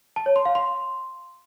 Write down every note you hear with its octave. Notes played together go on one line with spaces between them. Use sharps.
A5
C#5
C6
F5
C6